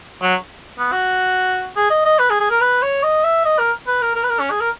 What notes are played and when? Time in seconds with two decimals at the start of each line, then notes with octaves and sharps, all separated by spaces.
0.22 F#3
0.79 B3
0.92 F#4
1.76 G#4
1.90 D#5
2.05 D#5
2.19 B4
2.30 G#4
2.40 G#4
2.50 A#4
2.61 B4
2.82 C#5
3.03 D#5
3.24 E5
3.45 D#5
3.59 A#4
3.87 B4
4.02 A#4
4.15 A#4
4.23 B4
4.30 A#4
4.40 C#4
4.50 G#4
4.60 A#4